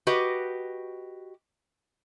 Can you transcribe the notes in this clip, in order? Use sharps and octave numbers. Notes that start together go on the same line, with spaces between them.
F#4 G4 B4 D#5